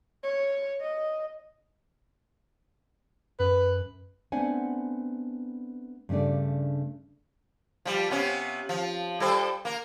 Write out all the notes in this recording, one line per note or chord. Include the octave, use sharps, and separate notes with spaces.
C#5
D#5
F#2 B4
A3 B3 C4 D4 F#5 G#5
G2 C#3 A3 D4 D5
F3 G3
C3 B3 C#4
F3
G3 A4 C5
A#3 A#4